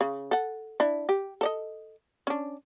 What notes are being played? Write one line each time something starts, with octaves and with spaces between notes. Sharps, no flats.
C#3
A4 F#5
D4 E4
G4
A4 D5 D#5
C#4 D4